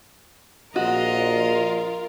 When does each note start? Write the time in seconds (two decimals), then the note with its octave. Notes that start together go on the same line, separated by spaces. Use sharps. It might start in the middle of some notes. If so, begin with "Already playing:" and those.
0.76 A#1 F4 F#4 A#4 D#5